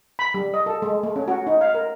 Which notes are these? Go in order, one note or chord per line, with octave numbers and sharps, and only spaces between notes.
B5
G3
D#5
A4
G#3
A3
C#4
F#4
D#4
F5
A#4